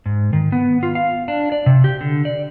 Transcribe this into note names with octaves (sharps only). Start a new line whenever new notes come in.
G#2
D#3
B3
F4
F5
D4
D5
C3
G4
D3
D5